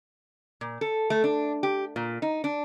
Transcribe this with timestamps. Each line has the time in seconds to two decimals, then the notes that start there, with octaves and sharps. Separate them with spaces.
0.61 A#2
0.81 A4
1.10 A3
1.24 D4
1.63 G4
1.96 A#2
2.22 D#4
2.44 D4